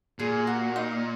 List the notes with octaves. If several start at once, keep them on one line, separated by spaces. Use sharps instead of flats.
A#2 G#4
F#4
D#4